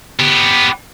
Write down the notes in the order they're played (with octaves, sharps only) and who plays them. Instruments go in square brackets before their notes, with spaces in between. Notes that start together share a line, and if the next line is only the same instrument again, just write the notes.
[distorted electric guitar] B3 G4